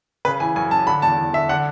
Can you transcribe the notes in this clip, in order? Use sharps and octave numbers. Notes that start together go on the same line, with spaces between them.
C#3 B4
E3 G#5
F#2 G#5
F#2 A5
D3 B5
E2 A5
E2
D3 E5
D3 F#5